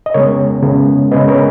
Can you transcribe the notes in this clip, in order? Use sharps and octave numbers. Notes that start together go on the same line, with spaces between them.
D#5
C#3 G#3 B3 A#4 C#5
C#3 G#3 B3
C#3 G#3 B3 B4 D#5
A#4 C#5